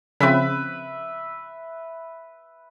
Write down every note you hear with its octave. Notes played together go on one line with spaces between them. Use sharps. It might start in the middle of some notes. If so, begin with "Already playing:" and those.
C#3 F3 C4 B4 E5 B5